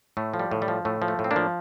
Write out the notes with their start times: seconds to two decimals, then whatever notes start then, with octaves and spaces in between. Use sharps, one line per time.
0.17 A2 A3
0.34 F3
0.39 G3
0.51 A2
0.62 G3
0.68 F3
0.85 A2 A3
1.02 F3
1.08 A3
1.19 A2
1.24 C4
1.31 A#3 D4
1.36 F3